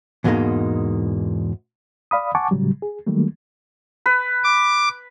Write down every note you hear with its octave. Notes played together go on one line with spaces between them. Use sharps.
E2 G#2 B2 G#3 A#3 D#4
D5 F5 B5 D#6
F#5 G#5 A5 C#6 D6
A2 C#3 F#3 G3
G#4
D#3 F#3 G3 A3 A#3
B4
D6